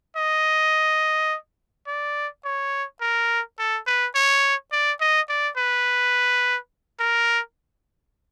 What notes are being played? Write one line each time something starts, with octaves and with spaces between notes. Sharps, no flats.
D#5
D5
C#5
A#4
A4
B4
C#5
D5
D#5
D5
B4
A#4